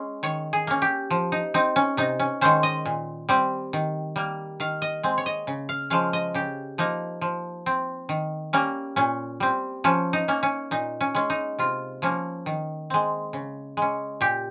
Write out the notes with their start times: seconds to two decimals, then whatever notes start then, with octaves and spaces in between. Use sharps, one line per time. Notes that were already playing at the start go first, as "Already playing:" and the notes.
Already playing: G#3 C#4
0.23 D#3 C#5
0.53 G#4
0.67 A#3 C#4
0.82 G4
1.11 F3
1.32 D#4
1.54 C4 D#4
1.76 C#4
1.97 C3 D#4
2.20 C#4
2.41 D#3 G#3 C#4 C5
2.63 D#5
2.86 A#2
3.29 G3 C4
3.73 D#3
4.16 G3 A#3
4.60 D#3 F5
4.82 D#5
5.03 G#3 C4
5.18 C#5
5.26 D#5
5.47 C#3
5.69 F5
5.90 F3 G#3 C#4 F5
6.13 D#5
6.34 C#3 G4
6.78 F3 A#3 D#4
7.21 F3
7.66 C4
8.09 D#3
8.53 G3 A#3 C#4
8.96 A#2 C#4
9.40 G3 C4
9.84 F3 C#4
10.13 D#4
10.28 A#3 C#4
10.43 C#4
10.71 A#2 D#4
11.01 C#4
11.15 G#3 C#4
11.30 D#4
11.59 C3 F4
12.02 F3 A#3 C#4
12.46 D#3
12.90 G#3 C4
13.33 C#3
13.77 G#3 C#4
14.21 A#2 G4